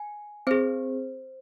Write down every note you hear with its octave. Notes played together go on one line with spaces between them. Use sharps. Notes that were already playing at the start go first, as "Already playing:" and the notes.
Already playing: G#5
C4 G#4 C5